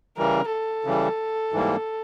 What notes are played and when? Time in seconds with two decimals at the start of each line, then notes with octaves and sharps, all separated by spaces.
0.18 C#3 E3 G3 A#4
0.52 A4
0.85 C#3 E3 G3
1.52 G#2 E3 G3 A#3